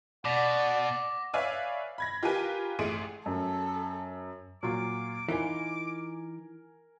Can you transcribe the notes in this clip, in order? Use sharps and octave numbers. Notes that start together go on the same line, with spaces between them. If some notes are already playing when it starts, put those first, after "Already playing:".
B2 D5 F#5 D6 A#6 B6
B4 C#5 D5 E5 F5 G#5
B5 G#6 A#6
F4 G4 A#4 B4 G#5
A1 A3 G#4 C6 D7 D#7
F#2 A4
A#2 F#3 F4 D6
E3 D#4 F4 A#4 G#5